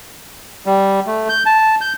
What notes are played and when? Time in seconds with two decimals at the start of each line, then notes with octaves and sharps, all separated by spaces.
0.66 G3
1.07 A3
1.29 G6
1.46 A5
1.81 G6